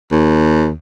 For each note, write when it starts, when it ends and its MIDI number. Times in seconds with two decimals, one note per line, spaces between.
0.11 0.72 39